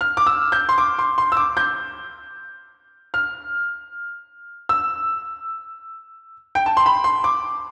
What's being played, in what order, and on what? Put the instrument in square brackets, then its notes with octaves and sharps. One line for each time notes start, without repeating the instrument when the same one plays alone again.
[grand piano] F6
D6
E6
G6
C6
D6
C6
C6
E6
D6
G6
F6
E6
G5
A5
C6
B5
C6
D6